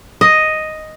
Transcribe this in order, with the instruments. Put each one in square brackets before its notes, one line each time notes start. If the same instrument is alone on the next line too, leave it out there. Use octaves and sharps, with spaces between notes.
[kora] D#5